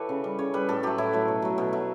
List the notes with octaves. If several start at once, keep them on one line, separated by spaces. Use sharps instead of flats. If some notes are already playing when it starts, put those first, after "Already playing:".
Already playing: E3 G4 A4 B4 C#5
C#3
G3
C#3 C#5
G3 B4
A2 A4
F#3 A3 G4
A2 E4
F#3 A3
B2
F#3 A3
B2
F#3 A3